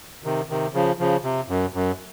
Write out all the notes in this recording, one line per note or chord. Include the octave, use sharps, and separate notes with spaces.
C3 D#3
C3 D#3
C#3 F3
C#3 F3
C3
F#2
F#2